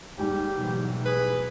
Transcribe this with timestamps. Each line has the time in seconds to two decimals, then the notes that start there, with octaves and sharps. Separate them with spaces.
0.18 D#2 G#2 G3 G4
0.54 B2 E3 F#3
1.05 G#4 B4